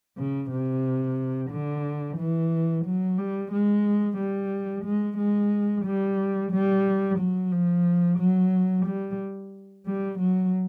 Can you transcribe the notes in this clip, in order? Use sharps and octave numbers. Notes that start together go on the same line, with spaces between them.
C#3
C3
D3
E3
F#3
G3
G#3
G3
G#3
G#3
G3
G3
F#3
F3
F#3
G3
G3
F#3